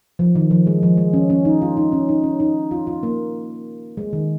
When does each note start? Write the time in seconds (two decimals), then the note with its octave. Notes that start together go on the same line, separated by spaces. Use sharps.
0.19 F3
0.35 D#3
0.51 F3
0.67 G#3
0.83 F3
0.97 G#3
1.13 C#4
1.30 C#4
1.45 D#4
1.62 F4
1.77 D#4
1.92 C#4
2.09 D#4
2.24 C#4
2.40 D#4
2.71 F4
2.87 F4
3.03 A#3
3.97 G#3
4.13 D#3